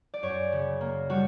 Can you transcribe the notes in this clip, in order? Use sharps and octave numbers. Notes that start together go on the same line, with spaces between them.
D5
F#2 C#5
C#3
A#3
G3 F#4